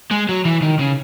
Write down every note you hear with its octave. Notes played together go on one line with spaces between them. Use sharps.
G#3
F#3
E3
D#3
C#3